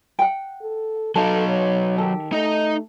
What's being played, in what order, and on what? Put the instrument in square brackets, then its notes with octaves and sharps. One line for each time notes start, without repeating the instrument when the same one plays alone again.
[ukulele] F#5 G5
[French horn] A4
[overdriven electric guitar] F#3 D#4 [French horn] A4 [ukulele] F5 A5
[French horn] C#5
[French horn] D#3 [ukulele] G4 A4
[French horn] A3 [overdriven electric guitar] D#4 D#5